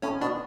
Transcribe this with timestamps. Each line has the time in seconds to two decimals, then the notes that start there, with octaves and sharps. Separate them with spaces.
0.02 A2 C#4 C#5
0.21 B2 D4 D5